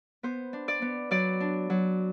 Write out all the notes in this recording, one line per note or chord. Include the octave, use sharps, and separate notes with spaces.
B3 C5
D4
D5
B3
F#3 D5
D4
F#3